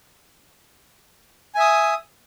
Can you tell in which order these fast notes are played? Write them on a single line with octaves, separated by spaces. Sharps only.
G#5 E5 D#6